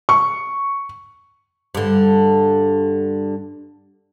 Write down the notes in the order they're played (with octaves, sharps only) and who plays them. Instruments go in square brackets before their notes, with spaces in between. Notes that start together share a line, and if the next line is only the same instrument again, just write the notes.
[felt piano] C#6
[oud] G2 D3